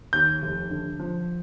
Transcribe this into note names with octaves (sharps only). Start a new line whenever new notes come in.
D#2 G6
F1
D3
F3